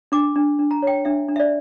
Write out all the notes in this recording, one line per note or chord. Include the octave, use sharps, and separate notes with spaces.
D4 D6
D4
D4
A#5
C#5 G5
D4 E5
D4
E5
D5